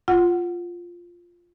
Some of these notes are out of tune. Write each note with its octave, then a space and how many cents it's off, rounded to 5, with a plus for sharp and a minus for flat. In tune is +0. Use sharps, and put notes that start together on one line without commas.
F4 +0 F#5 +0